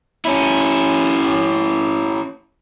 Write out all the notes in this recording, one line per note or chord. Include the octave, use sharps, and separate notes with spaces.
C#4 E4